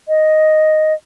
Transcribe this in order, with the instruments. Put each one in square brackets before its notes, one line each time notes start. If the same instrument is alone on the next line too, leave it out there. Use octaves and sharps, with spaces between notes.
[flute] D#5